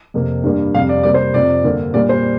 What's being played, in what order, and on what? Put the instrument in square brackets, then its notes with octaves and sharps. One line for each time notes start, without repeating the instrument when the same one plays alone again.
[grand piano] F2 C3 A#3
G2 G3 A#3
F2 C3 G3 F5
D5
C3 G3 A#3 D5
C5
F2 C3 F3 D5
G2 D3 A#3
A#2 G3 A#3 D5
C5